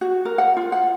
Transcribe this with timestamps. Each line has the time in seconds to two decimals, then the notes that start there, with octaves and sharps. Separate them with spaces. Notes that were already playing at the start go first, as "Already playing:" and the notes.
0.01 F#4
0.25 A#4
0.38 F#5
0.57 F4
0.72 F#5